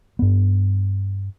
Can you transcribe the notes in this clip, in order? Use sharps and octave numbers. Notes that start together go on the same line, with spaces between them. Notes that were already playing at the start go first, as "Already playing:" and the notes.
G2 B3